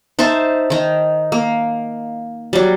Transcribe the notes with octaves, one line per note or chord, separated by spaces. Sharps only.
D#4 C5 E5 A5
D#3 D#4
A#3
F#3 G3